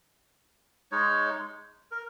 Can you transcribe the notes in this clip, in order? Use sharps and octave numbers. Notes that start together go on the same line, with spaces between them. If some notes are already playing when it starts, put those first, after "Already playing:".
G#3 D#4 C#5
A#4